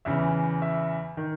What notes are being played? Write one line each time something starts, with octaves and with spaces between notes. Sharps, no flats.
E2 C#3 E3 E5
E5
D#3